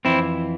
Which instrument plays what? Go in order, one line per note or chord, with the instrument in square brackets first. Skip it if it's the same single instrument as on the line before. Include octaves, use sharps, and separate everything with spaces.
[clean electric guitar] F2 E3 C4 E4